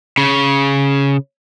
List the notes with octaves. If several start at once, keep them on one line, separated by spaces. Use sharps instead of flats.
C#3